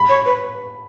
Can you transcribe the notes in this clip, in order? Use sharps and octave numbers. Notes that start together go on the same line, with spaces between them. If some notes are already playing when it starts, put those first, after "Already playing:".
Already playing: B5
C#5
B4